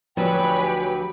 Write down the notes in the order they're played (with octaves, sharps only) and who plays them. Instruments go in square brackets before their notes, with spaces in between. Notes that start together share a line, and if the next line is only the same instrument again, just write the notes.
[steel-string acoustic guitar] D2 F#3 [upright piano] F3 [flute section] G4 G5 G#5 [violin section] B4 C#5